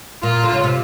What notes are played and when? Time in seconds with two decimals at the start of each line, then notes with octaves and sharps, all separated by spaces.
0.23 A#2 F4
0.43 D3
0.53 C#3
0.64 C3